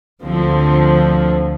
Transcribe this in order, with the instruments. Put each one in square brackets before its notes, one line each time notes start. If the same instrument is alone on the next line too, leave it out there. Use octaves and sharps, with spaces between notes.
[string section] D2 D3 F3 C4